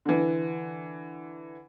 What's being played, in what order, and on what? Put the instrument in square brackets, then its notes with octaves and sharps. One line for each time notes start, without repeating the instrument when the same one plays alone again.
[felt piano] D3 E3